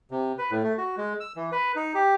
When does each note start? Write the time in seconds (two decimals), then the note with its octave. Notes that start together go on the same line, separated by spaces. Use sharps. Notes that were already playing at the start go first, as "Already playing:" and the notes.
0.11 C3
0.38 B4
0.51 A2
0.63 A3
0.78 F#4
0.97 G#3
1.20 E6
1.36 E3
1.52 B4
1.76 D#4
1.95 G4